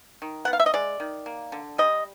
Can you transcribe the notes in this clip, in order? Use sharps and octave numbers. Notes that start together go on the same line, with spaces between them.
D#3
B3 F#5
F5
E5
D#5
G#3 D5
D#3
A#3
D3
G3 D#5